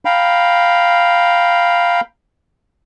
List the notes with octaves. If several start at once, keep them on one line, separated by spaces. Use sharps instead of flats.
F5 G5 A#5 B5